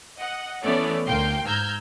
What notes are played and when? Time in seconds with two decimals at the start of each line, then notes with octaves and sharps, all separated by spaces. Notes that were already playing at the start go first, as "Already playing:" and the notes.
0.16 D#5 F#5
0.62 E3 A3 B3 C#4 C#5 D5
1.08 D2 A#3 F5 G5 C6
1.46 G#2 A#5 E6 F6 G6 G#6